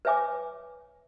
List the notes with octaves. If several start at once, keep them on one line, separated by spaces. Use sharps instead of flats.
B4 C#5 E5 G#5 D6